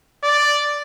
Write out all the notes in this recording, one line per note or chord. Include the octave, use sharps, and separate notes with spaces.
D5